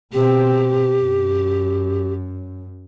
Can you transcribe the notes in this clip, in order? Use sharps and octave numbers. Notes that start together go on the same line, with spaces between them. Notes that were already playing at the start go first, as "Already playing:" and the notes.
B2 C4 G4
F#2